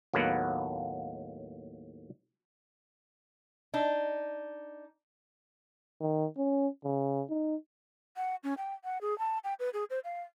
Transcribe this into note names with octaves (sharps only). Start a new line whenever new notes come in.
D#2 A2 F#3 A#3 B3 F#5
D4 D#4
D#3
C#4
C#3
D#4
F#5
C#4
G5
F#5
G#4
A5
G5
B4
G#4
C5
F5